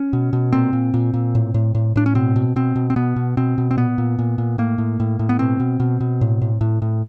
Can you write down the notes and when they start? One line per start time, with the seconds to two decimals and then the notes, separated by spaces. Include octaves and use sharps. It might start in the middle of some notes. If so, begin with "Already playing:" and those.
Already playing: C#4
0.13 B2
0.33 B2
0.53 A#2 C4
0.73 A#2
0.94 A#2
1.14 A#2
1.35 A2
1.54 A2
1.75 A2
1.96 A2 D4
2.06 C#4
2.15 B2 C4
2.36 B2
2.56 B2 C4
2.75 B2
2.90 C4
2.96 B2 B3
3.16 B2
3.37 B2 C4
3.58 B2
3.71 C4
3.77 A#2 B3
3.98 A#2
4.19 A#2
4.38 A#2
4.58 A2 A#3
4.78 A2
5.00 A2
5.19 A2
5.29 B3
5.39 B2 C4
5.60 B2
5.80 B2
6.01 B2
6.21 A2
6.42 A2
6.61 A2
6.82 A2